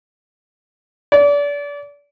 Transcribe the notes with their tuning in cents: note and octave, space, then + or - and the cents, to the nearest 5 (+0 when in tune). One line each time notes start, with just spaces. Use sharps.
D5 -30